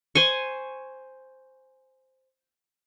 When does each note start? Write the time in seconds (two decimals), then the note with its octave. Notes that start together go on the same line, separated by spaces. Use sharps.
0.15 C5 G#5 C#6